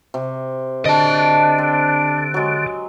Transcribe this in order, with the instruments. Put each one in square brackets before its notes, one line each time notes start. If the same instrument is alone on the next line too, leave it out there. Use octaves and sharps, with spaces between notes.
[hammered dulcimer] C3
[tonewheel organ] D3 [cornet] D4 [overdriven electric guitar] D#5 A5
[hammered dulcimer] C4
F#3 G#3